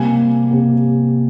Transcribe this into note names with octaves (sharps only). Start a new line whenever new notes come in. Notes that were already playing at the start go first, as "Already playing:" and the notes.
Already playing: C3 G3 A#3 G#5
C3 G3 A#3